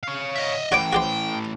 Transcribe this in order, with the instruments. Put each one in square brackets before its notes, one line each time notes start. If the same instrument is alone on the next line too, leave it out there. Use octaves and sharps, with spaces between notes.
[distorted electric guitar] C#5 F5
[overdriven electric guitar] D#5 E5
[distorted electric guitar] A2 E3 [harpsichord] F#4 C#5 D6 [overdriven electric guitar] G5
[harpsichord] F#4 G4 C5